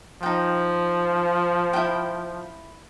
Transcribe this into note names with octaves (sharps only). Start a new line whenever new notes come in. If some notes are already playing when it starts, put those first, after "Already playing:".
F3 D#4 G5
E4 G5